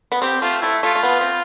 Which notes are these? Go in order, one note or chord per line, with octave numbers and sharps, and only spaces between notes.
B3
C4 G4
A3 F4
A3 E4
A3 F4
A3
B3
C4